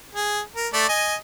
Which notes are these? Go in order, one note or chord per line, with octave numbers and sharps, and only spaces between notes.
G#4
A#4
A3 D5
D#5 G#5